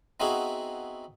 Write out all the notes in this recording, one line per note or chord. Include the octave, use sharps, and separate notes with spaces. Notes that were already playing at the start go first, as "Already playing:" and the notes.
B3 C4 D#4 E4 F#4 G#4